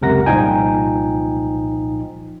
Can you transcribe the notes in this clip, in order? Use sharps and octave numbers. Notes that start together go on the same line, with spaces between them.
C#2 F#2 C3 A#4 F#5 A#6
C2 A#2 F3 D#4 G5 G#5